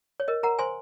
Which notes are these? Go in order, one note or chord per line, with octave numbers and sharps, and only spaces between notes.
C#5
A#4 D#5
A#4 F#5 A#5
C5 G#5 C6